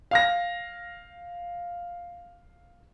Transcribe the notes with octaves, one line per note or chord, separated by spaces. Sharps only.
F5 F6 A#6